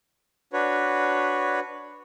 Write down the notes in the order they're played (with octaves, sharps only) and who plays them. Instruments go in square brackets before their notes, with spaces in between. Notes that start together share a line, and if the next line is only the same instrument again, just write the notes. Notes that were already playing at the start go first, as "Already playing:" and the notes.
[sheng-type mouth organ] D4 F#4 B4 C#5